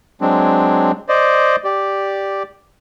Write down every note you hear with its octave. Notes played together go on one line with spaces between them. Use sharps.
F#3 G#3 C4 D4
C5 D5 D#5
G4 D5